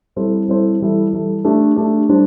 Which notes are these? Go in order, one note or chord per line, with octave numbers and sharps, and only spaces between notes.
G3 C4 E4 A4 C5
G3 C4 E4 A4 C5
E3 G3 E4 A4
E3 G3 E4 A4
A3 D4 G4
A3 D4 G4
G3 D4 C5